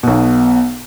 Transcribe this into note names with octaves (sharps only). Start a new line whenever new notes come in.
B1 B2